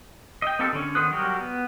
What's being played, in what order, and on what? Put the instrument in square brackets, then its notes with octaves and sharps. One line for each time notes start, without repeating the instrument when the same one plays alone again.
[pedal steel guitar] D#5 G5
A#3 C4 D#4 G4 A4
D3 C#4
D#3 B3 C5 D#6 F#6
F#3 G3 F#4 G4 A#4
B3